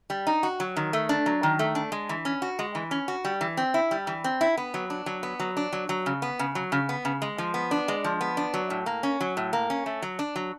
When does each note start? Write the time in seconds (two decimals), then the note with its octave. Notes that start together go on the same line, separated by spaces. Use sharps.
0.10 G3
0.27 D#4
0.43 F#4
0.60 F#3
0.76 D#3
0.93 A3
1.09 D4
1.26 F#3
1.43 D#3
1.59 A3
1.75 D4
1.92 G#3
2.09 E3
2.25 C#4
2.42 F#4
2.59 G#3
2.75 E3
2.91 C#4
3.08 F#4
3.25 G3
3.41 E3
3.57 C4
3.74 E4
3.91 G3
4.07 E3
4.24 C4
4.41 E4
4.57 B3
4.74 F#3
4.90 D4
5.06 F#3
5.23 B3
5.40 F#3
5.57 D4
5.73 F#3
5.89 F#3
6.06 C#3
6.22 B3
6.39 C#3
6.55 F#3
6.72 C#3
6.89 B3
7.05 C#3
7.22 G#3
7.38 F3
7.54 B3
7.71 D4
7.88 G#3
8.04 F3
8.21 B3
8.37 D4
8.54 F#3
8.70 A2
8.86 A#3
9.03 C#4
9.21 F#3
9.37 A2
9.53 A#3
9.70 C#4
9.86 A3
10.02 F#3
10.19 D4
10.36 F#3